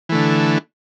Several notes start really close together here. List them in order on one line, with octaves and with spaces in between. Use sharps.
E3 A3 D3